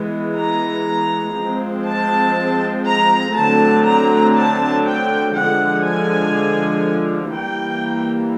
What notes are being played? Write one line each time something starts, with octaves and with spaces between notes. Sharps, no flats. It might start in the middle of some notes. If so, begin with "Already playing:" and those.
Already playing: E3 G#3 B3
A#5
F3 G#3 C4
A5
A#5
D3 F#3 A3 C4 A5
A#5
A5
G5
D3 F3 G#3 F#5
G#5
E3 G3 A#3 G5